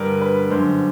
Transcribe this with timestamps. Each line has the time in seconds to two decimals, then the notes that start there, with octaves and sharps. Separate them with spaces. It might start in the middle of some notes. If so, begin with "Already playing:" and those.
Already playing: G2 D3 G3 A#4 B4
0.21 B4
0.50 F#2 D3 G3 C5